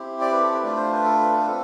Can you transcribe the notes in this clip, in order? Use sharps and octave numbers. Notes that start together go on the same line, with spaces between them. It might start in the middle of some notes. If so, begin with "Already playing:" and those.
Already playing: C4 E4 G4
D5
B4
A4
B4
A3 D4 F4 D5
C5
B4
A4
B4
A4
B4
C4 A4